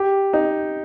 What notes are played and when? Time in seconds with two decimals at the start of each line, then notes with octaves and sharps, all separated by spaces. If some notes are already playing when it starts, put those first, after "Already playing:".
Already playing: G4
0.33 D#4